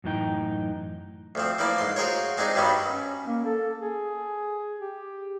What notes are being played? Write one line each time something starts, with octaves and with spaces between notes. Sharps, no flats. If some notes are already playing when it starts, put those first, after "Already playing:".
F#2 A2 E3 D#4 G5
D2 F3 C4
E3 F3 A#3 D5
G#2 C6
F4 F#4 G#4 A#4 C5 C#5
G#3 C4 D4 D#4 G#4
G2 D#3 F#3 G3 B3
C#4
A#3
A4
G#4
G4